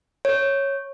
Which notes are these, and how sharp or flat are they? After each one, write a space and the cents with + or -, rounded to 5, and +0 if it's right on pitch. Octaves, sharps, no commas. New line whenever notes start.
C#5 -5